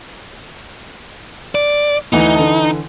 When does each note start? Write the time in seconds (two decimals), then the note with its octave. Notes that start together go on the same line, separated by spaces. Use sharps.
1.55 D5
2.13 D2 E3 D#4
2.35 D3 E3 A5